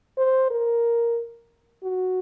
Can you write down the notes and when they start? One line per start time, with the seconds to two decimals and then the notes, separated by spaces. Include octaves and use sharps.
0.18 C5
0.50 A#4
1.84 F#4